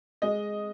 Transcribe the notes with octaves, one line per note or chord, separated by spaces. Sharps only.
G#3 D#5